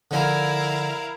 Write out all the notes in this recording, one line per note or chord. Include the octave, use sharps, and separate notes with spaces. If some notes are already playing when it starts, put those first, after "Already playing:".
D3 F3 E4 A#4 F5 G#5